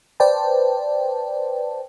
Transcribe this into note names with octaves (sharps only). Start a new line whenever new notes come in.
B4 C5 D5 G5 A5